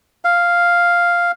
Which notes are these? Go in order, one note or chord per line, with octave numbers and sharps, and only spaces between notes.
F5